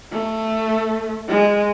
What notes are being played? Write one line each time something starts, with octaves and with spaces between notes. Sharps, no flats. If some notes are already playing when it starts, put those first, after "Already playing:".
A3
G#3